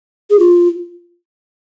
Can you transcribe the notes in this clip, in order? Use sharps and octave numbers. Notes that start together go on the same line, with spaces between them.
G#4
F4